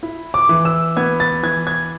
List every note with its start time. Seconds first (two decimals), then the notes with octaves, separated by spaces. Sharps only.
0.03 E4
0.34 D6
0.49 E3
0.65 E6
0.96 B3 G#6
1.20 A6
1.43 E3 G#6
1.67 G#6